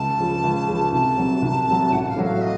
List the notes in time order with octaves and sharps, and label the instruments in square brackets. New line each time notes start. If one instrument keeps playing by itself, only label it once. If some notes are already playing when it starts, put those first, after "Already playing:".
Already playing: [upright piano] C#2 [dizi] A5
[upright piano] C#3 F3
C#2
C#3 F3
[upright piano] C2 [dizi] A5
[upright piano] C3 F#3
C2
C3 F#3
[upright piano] A1 [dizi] F#5
[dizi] F#5
F5
[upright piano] A2 F#3
[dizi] F5
D#5